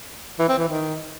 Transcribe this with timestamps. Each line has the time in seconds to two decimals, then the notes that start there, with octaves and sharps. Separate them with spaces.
0.39 E3
0.49 C4
0.58 E3
0.68 D#3